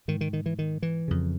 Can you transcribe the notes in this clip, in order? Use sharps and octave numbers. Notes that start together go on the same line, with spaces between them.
G#2 D#3
D#3
D#3
E3
D#3
E3
F2 C#3